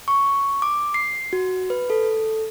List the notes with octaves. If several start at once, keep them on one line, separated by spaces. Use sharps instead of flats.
C#6
D6
C7
F#4
B4
A4